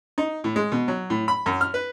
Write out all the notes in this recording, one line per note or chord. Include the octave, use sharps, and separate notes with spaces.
D#4
A2
G#3
B2
F#3
A2
B5
F#2
F6
B4